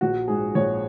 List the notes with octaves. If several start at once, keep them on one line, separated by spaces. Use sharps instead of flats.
A#1 F#4
G#2 G#4
A#1 C#5